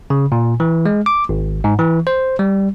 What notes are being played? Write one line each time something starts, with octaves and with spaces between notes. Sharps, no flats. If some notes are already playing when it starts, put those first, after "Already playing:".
C#3
A#2
E3
G#3
D6
G#1
G#2
E3
C5
G3